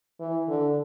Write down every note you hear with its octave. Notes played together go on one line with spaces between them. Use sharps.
E3
D3